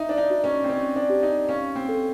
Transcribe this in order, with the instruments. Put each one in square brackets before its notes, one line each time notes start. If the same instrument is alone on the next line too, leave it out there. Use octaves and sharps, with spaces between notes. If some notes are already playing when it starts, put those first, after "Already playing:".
Already playing: [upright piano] D#4 [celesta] E5
[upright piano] D4
D#4
[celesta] F#4
[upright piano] C#4
C4
[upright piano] C#4 [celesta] D#5
[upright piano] D4
[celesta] G4
[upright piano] D#4
[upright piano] C#4 [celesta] F5
[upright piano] C4
[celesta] A4